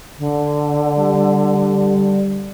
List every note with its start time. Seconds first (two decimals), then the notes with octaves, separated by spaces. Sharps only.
0.19 D3
0.98 G3